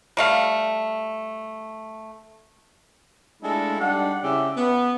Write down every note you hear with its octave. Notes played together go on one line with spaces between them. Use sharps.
G3 A3 F5
G#3 A3 D4 E4 F4 A4
G3 D4 D#4 F#5
C#3 C#4 E4 G4 E5
B3